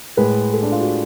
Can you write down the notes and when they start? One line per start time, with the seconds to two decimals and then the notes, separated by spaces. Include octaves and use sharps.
0.17 A2 G#3 B4
0.53 A4
0.63 D4
0.72 F4
0.81 F#4